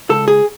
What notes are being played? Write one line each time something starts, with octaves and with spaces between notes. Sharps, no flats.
C#2 A4
G#4